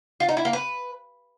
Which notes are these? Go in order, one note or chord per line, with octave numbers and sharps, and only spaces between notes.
F4
D#4
E4
A#3
B4